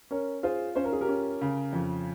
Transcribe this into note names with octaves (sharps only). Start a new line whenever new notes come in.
C#4 A#4 C#5
F4 G#4 C5
C#4 C5
A#4
G#4
G4 A#4
C#4
C#3
F2